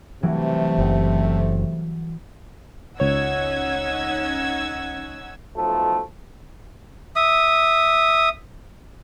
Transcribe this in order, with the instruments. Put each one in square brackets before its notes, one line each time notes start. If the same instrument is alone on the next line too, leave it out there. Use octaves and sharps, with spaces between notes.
[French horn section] C3 A3 [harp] E3 F#3 G3
[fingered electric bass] F#1
[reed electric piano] C#2 C#5 [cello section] C#4 D#4 [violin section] F#5 E6 G#6
[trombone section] B1 F3 A3
[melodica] E5 D#6